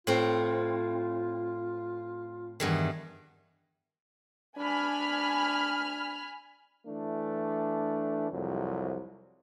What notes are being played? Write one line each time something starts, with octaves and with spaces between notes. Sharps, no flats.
A2 C4 F4
E2 G2 D#3
D4 G#5 B5 F6
E3 A3 D4
C2 F2 C3 F#3